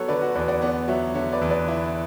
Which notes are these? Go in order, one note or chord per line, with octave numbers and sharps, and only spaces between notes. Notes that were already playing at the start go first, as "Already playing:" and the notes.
Already playing: F#3 B3 A4 C#5
D3 B4 D5
F#4
E2 B4 D5
D5 F#5
B3 D5 F#5
F#3 C#5 E5
D3 C#5 E5
B4 D5
E2
B4 D5
E4